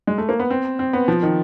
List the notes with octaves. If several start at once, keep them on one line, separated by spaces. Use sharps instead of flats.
G#3
A3
A#3
B3
C4
C4
B3
F3
D#3